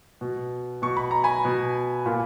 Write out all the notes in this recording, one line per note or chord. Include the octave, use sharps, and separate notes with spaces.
B2
B2 C#6
B5
A#5
G#5 B5
B2
A#2